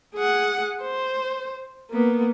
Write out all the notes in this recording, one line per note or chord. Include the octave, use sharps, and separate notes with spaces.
G#4 F#5
C5
A#3 B3